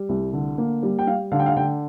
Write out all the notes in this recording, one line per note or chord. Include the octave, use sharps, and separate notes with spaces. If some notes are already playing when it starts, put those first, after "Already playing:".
Already playing: G3
C2
D3
A#3
G3
G5
G3 F5
D3 F5
G5
F5
D3 G5